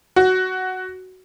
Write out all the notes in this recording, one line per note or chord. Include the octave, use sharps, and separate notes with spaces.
F#4